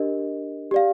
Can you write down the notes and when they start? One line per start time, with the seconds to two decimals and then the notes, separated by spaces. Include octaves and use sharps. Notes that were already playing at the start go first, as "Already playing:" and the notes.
Already playing: D4 G4 A#4 D#5
0.71 G4 D5 F5